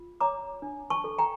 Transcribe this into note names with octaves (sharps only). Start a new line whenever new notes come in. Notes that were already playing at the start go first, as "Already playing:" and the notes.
Already playing: F4
C#5 A#5 D6
D4
A5 C#6
A4
G5 A#5